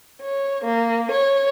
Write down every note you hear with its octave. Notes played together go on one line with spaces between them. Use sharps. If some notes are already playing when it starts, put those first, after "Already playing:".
C#5
A#3
C#5